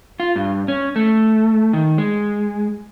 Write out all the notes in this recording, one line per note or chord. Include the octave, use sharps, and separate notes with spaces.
F4
G2
C#4
A3
D#3
G#3